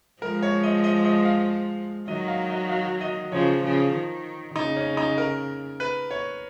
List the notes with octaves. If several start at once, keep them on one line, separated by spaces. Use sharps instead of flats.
F3 G#3 A#4
C#5
D#5
D#5
D#5
F5
D#3 F#3 D#5
F5
D#5
F5
D#5
C#3 F3 C#5
C#3 F3
D#3
C#3 D#4
C#4
D#4
A#4
B4
C#5